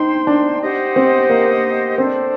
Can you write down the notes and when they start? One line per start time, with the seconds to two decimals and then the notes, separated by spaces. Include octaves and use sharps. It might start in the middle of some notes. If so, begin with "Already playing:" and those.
Already playing: D#4 C5 G5 C6
0.27 D4
0.61 G4 C5 D#5 F#5
0.96 C4
1.30 A#3
1.97 C4 D4 A4 C5